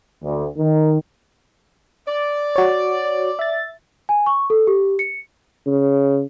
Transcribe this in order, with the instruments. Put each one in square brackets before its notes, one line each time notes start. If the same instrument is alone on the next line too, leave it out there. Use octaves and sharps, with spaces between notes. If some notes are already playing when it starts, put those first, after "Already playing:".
[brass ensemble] D2
D#3
[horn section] D5
[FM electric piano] F#4 C#5
E5 A6
[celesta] G#5
C#6
A4
G4
C#7
[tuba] C#3